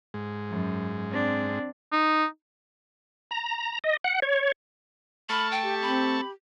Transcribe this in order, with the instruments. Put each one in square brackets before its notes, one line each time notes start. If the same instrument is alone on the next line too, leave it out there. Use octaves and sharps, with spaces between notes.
[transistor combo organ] G#2
[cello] F#2
C4 D4
[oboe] D#4
[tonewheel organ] A#5
D#5
F#5
C#5
[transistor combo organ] A3 A5 C#6 [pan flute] B5 [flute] F6
[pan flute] G5
[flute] G4
[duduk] C4 [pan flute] B5